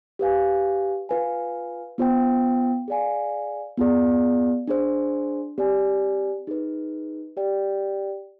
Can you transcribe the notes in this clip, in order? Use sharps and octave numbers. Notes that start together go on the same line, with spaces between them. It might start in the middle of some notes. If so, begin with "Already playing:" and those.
G4 B4 F5 G#5
F4 B4 F5 G#5
B3 F4 C5 G5
G#4 D5 F5 G#5
B3 F4 G#4 D5
D4 G#4 C5
C4 G4 D5 G#5
D#4 G#4 B4
G4 D5 G5